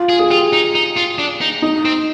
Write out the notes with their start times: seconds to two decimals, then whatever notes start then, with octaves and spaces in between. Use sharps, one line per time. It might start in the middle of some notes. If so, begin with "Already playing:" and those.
Already playing: F4
0.09 G#4
0.19 G#4
0.30 F4 G4
0.53 D#4
0.75 D#4
0.97 F4
1.18 D4
1.41 D#4
1.62 D#4
1.85 C4